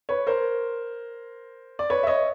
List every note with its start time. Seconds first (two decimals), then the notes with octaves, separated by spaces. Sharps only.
0.09 B4 C#5
0.27 A#4 C5
1.79 D5
1.90 B4 C#5
2.03 E5
2.07 C#5 D#5